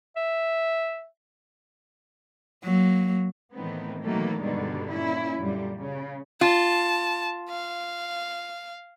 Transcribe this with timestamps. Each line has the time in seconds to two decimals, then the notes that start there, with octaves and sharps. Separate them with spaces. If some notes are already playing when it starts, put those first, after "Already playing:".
0.17 E5
2.64 F#3 A#3
3.53 A2 D#3 E3 B3 C4
4.03 B2 D#3 E3 F#3 A3 A#3
4.40 G2 B2 D3 D#3 G3 G#3
4.91 A#2 C#4 E4
5.39 F#2 A#2 D3 G3
5.75 C#3
6.41 F4 A5
7.50 F5